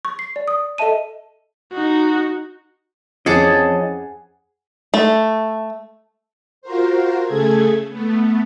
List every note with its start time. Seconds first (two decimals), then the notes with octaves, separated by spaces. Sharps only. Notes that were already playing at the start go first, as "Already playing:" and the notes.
0.05 C#6
0.19 C7
0.36 D5
0.48 D#6
0.78 A4 D#5 E5 A5 D#7
1.73 D#4 F#4
3.26 F2 E3 C#4 G#4 D#5 F#5 A5 D6
4.94 A3
6.62 F4 F#4 A#4 C5
7.25 C#3 A3 G#4 A4 G#6
7.89 A3 B3